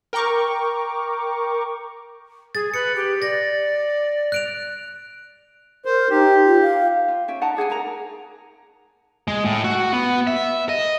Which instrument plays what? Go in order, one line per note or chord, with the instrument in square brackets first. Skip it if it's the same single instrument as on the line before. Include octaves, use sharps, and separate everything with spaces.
[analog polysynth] A#4 G5 A#5 C#6 D6
[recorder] G#4 [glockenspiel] A6
[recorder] B4 [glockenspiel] C#7
[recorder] G4
[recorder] D5 [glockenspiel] A6 A#6
[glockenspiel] F#6 D7 F7
[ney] A#4 [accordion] C5
[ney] D#4 [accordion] G4
[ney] F4
F5
[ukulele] F4
C#4 E5 G5
D#4 F#5 A5 A#5
D4 G#4 F#5 G#5
D#4 A#4 A#5
[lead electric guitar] G#3
A2
F#4
B3
E5
D#5